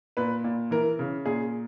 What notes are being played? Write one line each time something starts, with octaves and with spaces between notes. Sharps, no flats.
A#2 B4
A#2
E3 A#4
C#3
A#2 G#4